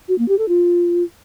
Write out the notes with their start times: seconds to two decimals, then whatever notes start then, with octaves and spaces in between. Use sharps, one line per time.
0.09 F#4
0.19 A#3
0.29 G4
0.38 A4
0.48 F4